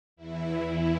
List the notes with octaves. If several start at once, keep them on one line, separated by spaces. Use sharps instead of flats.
E2 E3 E4